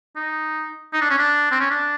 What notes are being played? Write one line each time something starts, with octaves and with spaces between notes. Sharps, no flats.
D#4
D#4
D4
C#4
D4
C4
C#4
D4